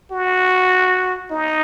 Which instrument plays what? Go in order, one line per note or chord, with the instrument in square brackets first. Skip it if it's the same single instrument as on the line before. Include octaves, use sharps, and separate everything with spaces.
[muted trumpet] F#4
D#4